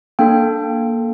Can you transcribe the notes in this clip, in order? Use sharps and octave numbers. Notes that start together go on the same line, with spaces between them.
A#3 D4 A4 G5